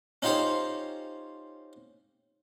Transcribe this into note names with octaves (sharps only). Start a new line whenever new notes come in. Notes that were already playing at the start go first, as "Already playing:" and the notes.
C#4 D#4 F4 G4 C5 C#5